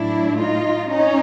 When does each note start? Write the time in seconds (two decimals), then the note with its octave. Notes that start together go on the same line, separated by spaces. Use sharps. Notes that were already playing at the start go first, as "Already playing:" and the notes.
Already playing: A2 F#3 A3 D4 E4
0.39 D#4 F4
0.90 C#4 D#4